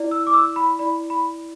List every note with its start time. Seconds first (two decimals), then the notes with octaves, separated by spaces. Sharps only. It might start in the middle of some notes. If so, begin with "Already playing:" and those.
Already playing: E4 D5
0.11 E6
0.27 D6
0.34 E6
0.56 B5
0.79 E4 D5 B5
1.10 B5